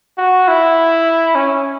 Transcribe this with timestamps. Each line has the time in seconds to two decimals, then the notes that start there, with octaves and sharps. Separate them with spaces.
0.18 F#4
0.48 E4
1.35 C#4